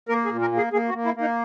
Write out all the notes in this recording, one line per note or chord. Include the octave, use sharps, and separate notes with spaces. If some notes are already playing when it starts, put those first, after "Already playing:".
A#3 A#4
G#4
A#2
A#4
A#3
G#4
A#3 G#4
F#4
A#3
E4
A#3 D#4